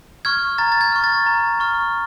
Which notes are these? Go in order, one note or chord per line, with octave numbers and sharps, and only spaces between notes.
C#6 F6 G#6
A#5 A6
A6
G#6
C#6 F6
A6
A#5
C#6 F6